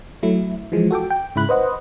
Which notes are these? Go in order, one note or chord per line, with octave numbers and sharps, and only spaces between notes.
F#3 A3 E4
E3 F3 G#3
F#4 A4 G5 D6
G5
G#2 C#3 E4 B5 F#6
B4 C5 D#5 F#5